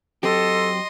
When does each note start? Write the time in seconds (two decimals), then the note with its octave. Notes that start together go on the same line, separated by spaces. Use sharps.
0.23 F#3 C4 G4 A4 D#5 C6